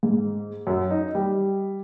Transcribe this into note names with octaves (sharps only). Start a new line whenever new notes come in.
G#2
F#2
D#4
G3